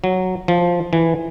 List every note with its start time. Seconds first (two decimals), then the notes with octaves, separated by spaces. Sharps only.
0.04 F#3
0.48 F3
0.93 E3